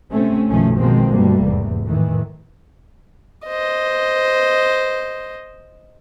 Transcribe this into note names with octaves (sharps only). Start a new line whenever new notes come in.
C3 A3 C4 C#4
B1 F#2 D#3 F3 A3 C#4
B2 D#3 F3 G#3 A#3 C4
D2 G2 B2 G3 A3 A#3
F1 E2 G#2
F2 A2 D#3 E3
C5 D#5